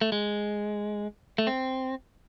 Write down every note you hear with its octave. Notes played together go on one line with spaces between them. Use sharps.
A3
G#3
A3
C4